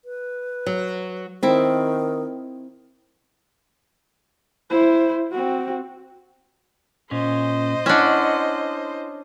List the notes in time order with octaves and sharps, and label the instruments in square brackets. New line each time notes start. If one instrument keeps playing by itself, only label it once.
[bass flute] B4
[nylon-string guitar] F#3
[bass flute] D#3 [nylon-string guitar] C4 E4
[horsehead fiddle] E4 C5
C4 F#4
[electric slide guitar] A#2 C#4 [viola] C5 D#5
[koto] C#4 D4 [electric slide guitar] E4 F#5